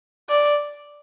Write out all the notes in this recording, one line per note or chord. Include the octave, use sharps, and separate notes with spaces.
D5